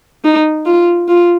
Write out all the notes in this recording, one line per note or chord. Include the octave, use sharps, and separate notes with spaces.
D#4
F4
F4